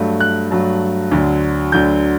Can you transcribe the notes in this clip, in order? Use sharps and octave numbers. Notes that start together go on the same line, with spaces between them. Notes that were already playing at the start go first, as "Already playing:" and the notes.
Already playing: G2 F#3 A3
F#6
G2 F#3 A3
D2 D3 F#3
D2 D3 F#3 G6